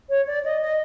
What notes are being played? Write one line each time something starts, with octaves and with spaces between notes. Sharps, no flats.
C#5
D5
D#5
D#5